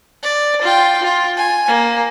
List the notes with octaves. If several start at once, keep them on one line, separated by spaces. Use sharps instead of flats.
D5
F4 G5
F4
G#5
A#3